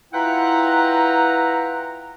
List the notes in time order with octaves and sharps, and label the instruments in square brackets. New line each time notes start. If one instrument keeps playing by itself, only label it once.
[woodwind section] E4 F4 B4 F#5 G5 A#5